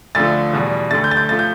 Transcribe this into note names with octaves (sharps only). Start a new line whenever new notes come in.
D2 D3 F3 A3 A6
E2 B2 G3
D2 D3 A3 A6
G6
A6
G6
F3 A3 A6
G6